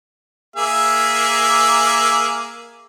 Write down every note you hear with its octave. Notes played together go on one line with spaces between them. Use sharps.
A#3 G#4 E5